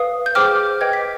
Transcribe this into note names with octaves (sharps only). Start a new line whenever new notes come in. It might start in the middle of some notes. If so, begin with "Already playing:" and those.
Already playing: B4 F5 D#6
G6
G#4 C5 G5 D6 F6
B4 D#5 G5 G#6
B6